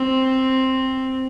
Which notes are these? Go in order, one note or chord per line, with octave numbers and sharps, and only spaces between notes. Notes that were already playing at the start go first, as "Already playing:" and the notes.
Already playing: C4